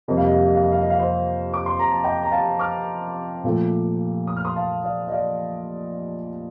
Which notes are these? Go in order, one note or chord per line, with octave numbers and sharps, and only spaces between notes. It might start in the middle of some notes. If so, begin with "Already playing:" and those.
F2 C3 G3 A#3 D#5
F5
D#5
F5
D#5
F5
D#5
F5
D#5
F5
C5 D#5
D6
C6
A#5
A5
D#5 G5
A#5
F5 A5
D6 F6
A#2 F3 A3
D#6
F6
C6 D#6
F5 A5
D5 F5
D#5
D5 F5